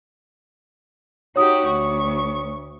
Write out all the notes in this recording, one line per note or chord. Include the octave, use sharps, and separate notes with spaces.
D#4 F#4 G4 C#5 D#6
D2 C#6